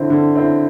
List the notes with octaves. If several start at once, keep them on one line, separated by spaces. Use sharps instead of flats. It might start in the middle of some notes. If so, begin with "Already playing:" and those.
Already playing: D3 C4 E4 C5
D3
C4 E4 C5